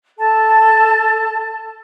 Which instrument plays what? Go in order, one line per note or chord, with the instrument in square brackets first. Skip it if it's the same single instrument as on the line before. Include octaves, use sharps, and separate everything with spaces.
[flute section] A4 A5